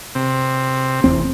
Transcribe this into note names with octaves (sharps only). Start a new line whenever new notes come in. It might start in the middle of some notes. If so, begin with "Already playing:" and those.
C3
F1 E2 C4